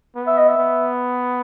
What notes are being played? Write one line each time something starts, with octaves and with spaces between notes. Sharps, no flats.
B3
E5
D#5
E5
B3